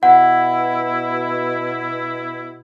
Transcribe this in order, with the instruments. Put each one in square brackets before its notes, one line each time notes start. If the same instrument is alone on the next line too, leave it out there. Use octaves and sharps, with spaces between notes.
[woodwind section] B2 E4 [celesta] F#5